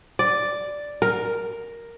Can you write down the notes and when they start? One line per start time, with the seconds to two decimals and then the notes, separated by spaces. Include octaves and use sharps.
0.19 D5
1.02 A#4